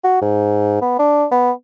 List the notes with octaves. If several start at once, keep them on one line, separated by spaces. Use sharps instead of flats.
F#4
G#2
B3
D4
B3